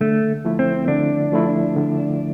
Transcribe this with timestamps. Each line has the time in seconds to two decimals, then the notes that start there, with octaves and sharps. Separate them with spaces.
0.01 D3 A3
0.45 F3 A3 E4
0.59 C4
0.88 D3 D4
1.32 F3 A3 E4
1.76 D3